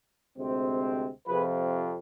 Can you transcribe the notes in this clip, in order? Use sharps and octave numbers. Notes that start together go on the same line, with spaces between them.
D2 C3 G#3 C4
F2 C3 F3 G#4 B4